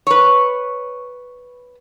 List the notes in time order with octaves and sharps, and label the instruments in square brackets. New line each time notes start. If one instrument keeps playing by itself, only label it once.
[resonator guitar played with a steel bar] B4 C#5